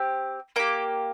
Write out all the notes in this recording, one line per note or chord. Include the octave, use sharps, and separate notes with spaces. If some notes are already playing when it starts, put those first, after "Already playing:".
Already playing: C4 G4
A#3 G4 D6